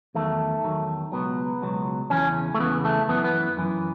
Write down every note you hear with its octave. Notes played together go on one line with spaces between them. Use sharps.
E2 D#3 F#3 A3
E2 D#3 F#3
C#2 B2 F#3 B3
C#2 B2 F#3
E2 C#3 E3 C#4
A3
E2 C#3 E3 B3
A3
F#2 E3 B3
B3
F#2 E3